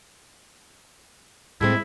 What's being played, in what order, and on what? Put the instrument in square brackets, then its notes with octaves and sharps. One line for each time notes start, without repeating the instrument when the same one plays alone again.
[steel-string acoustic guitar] A2 G#3 C4 [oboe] E4